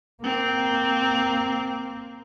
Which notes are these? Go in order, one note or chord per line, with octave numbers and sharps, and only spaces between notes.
A#3 C4